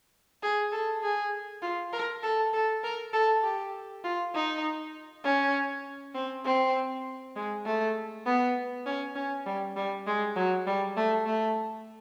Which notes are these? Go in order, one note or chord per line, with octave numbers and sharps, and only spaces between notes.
G#4
A4
G#4
F4
A#4
A4
A4
A#4
A4
G4
F4
D#4
C#4
C4
C4
G#3
A3
B3
C#4
C#4
G3
G3
G#3
F#3
G3
A3
A3